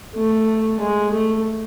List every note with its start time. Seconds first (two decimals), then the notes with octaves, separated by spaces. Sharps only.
0.16 A3
0.80 G#3
1.12 A3